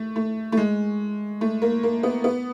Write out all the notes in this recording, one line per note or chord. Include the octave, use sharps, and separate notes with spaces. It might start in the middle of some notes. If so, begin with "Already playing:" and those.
Already playing: A3
A3
A3
G#3
A3
A#3
A#3
B3
B3